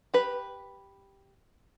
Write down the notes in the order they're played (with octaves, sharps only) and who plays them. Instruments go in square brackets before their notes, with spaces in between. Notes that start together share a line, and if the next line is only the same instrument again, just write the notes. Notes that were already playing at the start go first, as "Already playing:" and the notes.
[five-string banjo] G4 B4